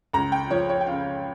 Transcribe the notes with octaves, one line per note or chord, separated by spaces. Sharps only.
C#2 A#5
G5
F3 C#5
C#5
G5
C#3 F5